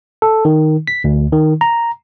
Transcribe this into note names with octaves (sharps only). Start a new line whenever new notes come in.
A4
D#3
B6
D2
D#3
A#5